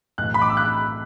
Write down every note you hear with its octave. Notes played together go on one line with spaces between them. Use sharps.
B1 A2 E3 F#6
B5
D6
E6
F#6